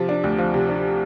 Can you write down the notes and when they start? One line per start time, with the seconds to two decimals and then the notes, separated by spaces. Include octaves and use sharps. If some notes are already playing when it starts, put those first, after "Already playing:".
Already playing: C3 F3
0.09 D4
0.24 D2
0.38 F3
0.54 C3
0.69 D4